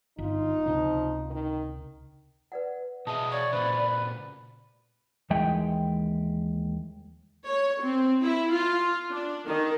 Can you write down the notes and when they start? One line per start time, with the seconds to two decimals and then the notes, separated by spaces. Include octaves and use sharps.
0.19 G1 D#4 F4
0.66 C#2 C3 F3 D4
1.30 D#3
2.52 B4 D5 F#5
3.07 B2 G#4 D#5 E5 A5
3.31 C#5 D5
3.53 A#2 C#3 B4 C5
5.30 D#2 E3 G#3 E5 G5
7.47 C#5
7.83 C4
8.25 E4
8.55 F4
9.10 D4
9.48 D#3